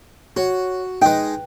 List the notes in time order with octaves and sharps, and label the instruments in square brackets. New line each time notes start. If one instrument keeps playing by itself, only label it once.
[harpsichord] F#4 [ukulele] C#5
[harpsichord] G#3 D#4 [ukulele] B4 G5